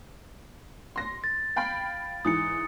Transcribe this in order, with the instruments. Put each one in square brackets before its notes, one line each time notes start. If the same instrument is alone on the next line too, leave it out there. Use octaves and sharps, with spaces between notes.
[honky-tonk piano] C6 A#6
[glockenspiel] A6
[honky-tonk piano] F5 G5 B5
[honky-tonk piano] G#2 E3 [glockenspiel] D#6 C#7